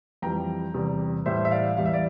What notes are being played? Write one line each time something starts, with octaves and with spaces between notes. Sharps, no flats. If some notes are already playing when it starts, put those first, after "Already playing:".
F2 E3 G3 G5 A#5
E2 C3 G3
A2 E3 G3 C5 E5
E5
D5 F5
E2 E3 G3 F5
E5
D5